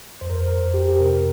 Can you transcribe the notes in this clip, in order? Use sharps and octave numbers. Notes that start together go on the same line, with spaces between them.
F2 C5
A#4
C5
F2 A#4
F2 G4
G4
C3 A#4